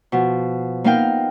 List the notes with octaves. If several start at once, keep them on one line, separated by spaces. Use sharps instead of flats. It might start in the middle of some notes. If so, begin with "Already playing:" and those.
B2 F3
A#3 B3 D#4 A#4 F5 G5